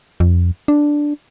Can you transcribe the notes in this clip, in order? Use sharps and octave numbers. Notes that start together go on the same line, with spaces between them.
F2
D4